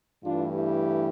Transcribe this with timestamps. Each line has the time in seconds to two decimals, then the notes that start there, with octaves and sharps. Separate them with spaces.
0.24 G2 E3 A3 D4 F4
0.54 E4 G4